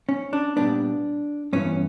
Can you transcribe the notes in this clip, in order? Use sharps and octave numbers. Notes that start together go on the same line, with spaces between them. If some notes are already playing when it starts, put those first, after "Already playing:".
C#4
D4
A#2 G3 B3 D4
G2 E3 B3 C#4